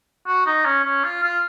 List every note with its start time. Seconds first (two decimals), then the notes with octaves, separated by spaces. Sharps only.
0.27 F#4
0.46 D#4
0.65 C#4
0.84 C#4
1.04 F4
1.23 F4